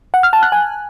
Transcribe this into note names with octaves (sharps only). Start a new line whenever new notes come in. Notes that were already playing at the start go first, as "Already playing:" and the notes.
F#5
F6
A5
F#6
G#5